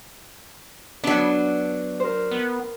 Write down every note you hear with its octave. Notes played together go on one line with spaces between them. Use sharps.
F#3 B3 D4
A#4 C5
B3